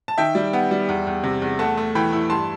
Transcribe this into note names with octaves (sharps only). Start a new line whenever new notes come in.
A5
D#3 E5 G5
G3
B3
G3
E2
E2
C3
E2
A3 F#5 A5
A3
E3 G5 B5
E4
G2 A5 C6